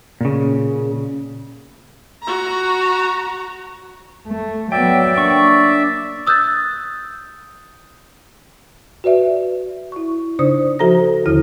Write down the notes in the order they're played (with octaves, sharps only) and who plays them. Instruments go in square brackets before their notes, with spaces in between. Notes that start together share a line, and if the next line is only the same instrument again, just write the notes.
[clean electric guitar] A#2 C#3
[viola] F#4 A#5
[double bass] A3
[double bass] F#3 B3 [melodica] D5 E5 [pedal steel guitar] G5
[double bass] A#3 [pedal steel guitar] D4 C#6
[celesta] D#6 E6 F#6 G6 A6
[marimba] F#4 B4 D5 E5
E4 C#6
C#3 D4 D#4 C5 D5 D#6
F3 F#4 A4 C5 A#5 A#6
D#2 D3 D#3 E4 F6